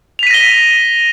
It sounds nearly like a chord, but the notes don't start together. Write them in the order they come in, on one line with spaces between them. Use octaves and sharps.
F7 B6 D#7 A#6 G7